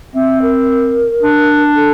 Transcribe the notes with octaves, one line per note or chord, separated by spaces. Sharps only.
C4 E5
A#4
D4
A4